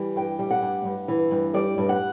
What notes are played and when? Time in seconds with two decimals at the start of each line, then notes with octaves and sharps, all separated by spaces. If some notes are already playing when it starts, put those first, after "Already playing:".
Already playing: E3 G3
0.16 G2 G5
0.39 G3
0.51 F#5
0.62 G2
0.85 G2
1.08 E3
1.31 G2
1.54 G3 D5
1.78 G2
1.89 F#5